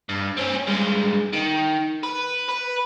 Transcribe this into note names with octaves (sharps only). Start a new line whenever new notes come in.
G2
C4 C#4
G2 G#3
D#3
B4
B4